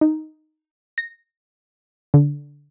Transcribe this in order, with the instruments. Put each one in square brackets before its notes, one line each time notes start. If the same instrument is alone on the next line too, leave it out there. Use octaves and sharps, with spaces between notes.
[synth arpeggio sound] D#4
A#6
D3